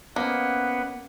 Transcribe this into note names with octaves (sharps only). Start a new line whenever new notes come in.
A#3 B3 C#4 C5 D#5 F#5